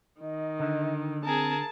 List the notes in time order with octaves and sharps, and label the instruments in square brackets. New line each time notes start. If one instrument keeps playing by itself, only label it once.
[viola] D#3 [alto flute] D#5
[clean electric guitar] D3
[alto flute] C4 [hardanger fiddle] G#4 A#4 [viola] A5